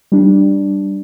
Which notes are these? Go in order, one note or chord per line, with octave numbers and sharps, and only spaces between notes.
G3 D4